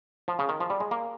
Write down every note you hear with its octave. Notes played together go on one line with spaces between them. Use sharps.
F3
C#3
D#3
F3
G3
G#3
A#3